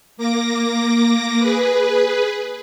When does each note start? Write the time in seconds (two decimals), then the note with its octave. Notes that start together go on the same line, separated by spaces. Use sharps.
0.17 A#3 D6 A#6
1.39 G#4 B4